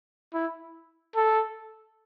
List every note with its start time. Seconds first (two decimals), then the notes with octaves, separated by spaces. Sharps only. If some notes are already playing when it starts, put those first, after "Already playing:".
0.34 E4
1.15 A4